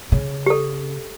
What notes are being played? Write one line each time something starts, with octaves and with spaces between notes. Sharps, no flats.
C#3
G4 A4